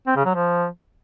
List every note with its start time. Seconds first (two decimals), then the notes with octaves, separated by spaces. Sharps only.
0.07 C4
0.16 C#3
0.26 F#3
0.35 F3